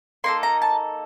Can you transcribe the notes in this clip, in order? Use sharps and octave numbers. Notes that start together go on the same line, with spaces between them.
A#3 D#4 A4 C6
A#5
A5